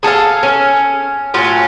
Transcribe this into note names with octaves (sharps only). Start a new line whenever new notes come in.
G#4 A4 D#5 F5
C#4
A2 F#3 C#4 F4